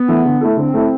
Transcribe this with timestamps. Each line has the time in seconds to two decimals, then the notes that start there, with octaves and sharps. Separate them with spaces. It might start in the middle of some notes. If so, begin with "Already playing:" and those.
Already playing: B3
0.08 E3 A3 E4
0.25 D3
0.41 A3 E4 A4
0.57 D3 C4
0.74 A3 E4 A4